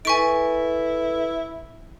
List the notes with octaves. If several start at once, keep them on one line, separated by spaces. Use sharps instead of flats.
E4 A4 B4 G#5 C#6 D7